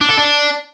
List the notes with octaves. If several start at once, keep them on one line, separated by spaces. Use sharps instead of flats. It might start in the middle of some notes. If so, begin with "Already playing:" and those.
D4
A4
D4